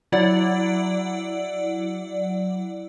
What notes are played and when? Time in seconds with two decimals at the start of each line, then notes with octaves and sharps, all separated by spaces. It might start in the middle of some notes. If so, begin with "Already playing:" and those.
0.12 F#3 E4 D5 F#5